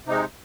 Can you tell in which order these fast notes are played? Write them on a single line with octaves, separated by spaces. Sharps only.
C3 D#4 G#3